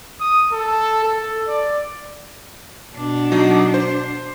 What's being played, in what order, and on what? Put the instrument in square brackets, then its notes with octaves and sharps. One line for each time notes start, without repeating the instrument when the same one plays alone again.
[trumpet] D#6
A4
A4
D5
[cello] B2 D4
[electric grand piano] F#3 D#4 D#5
C5